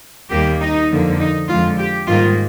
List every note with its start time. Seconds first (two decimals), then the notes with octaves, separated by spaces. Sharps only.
0.31 D#2 D#3 G3 A#3 G4
0.61 D#4
0.90 F2 D3 F3 A#3
1.20 D#4
1.49 F2 D3 G#3 F4
1.79 G4
2.08 G#2 D#3 G3 A#3 F4